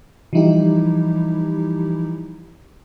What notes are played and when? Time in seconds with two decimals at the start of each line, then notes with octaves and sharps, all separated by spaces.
0.33 E3 F3 G3 D#4 E4 G4